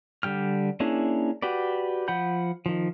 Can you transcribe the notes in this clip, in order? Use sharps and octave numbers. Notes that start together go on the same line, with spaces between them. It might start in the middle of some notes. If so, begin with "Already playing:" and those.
D3 G3 G5 F6
A#3 C#4 D4 E4 G#4
F#4 G4 B4 D5
F3 F#5 B5 G6
D#3 F3